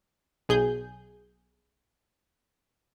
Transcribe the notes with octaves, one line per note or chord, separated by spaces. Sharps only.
B1 G#4 G6